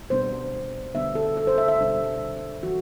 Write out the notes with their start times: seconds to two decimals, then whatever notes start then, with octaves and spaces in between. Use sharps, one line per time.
0.10 B2 G3 B3 D4 C5
0.94 D3 G3 B3 D4 E5
1.15 A4
1.37 A4
1.47 C5
1.58 E5
1.68 E5
1.79 B2 G3 D4
2.63 E3 G3 F#4